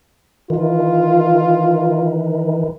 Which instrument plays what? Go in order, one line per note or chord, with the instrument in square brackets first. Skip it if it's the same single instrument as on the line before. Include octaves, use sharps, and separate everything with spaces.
[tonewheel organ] D#3 E3 [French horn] F4